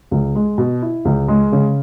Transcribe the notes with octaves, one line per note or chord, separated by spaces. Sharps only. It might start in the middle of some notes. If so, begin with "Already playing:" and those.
C#2
G#3
B2
E4
C#2
G#3
C#3